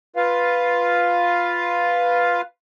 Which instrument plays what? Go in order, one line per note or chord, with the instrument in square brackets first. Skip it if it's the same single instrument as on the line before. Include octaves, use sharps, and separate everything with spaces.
[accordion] F4 B4 F5